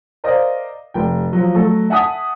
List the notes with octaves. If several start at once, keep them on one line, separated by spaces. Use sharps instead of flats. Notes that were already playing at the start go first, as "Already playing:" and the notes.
A#4 C5 D5 D#5 F5
F1 G5
F3 F#3
F#3 A3 A4
E5 F#5 G#5 A5 D#6 B6